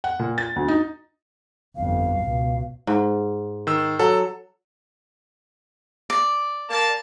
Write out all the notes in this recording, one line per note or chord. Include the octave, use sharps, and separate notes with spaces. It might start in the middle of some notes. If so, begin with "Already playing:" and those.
F#5
A#2
A6
D2
D#4
G1 F2 F5
C#2 B2
G#2
D#3 E6
F#3 A4
D5
A#3 A5